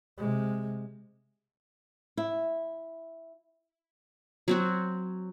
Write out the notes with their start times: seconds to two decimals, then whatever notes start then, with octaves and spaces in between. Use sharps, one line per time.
0.17 C3 G#3
2.17 E4
4.48 F#3 C4 F#4